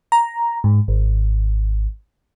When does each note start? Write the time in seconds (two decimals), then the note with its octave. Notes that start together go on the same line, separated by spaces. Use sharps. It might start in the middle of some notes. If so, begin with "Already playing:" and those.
0.12 A#5
0.64 G#2
0.88 G#1